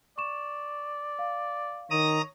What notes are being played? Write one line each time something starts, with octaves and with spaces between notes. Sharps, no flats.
D5 C#6 E7
F5
D#3 C#5 A#5 D#6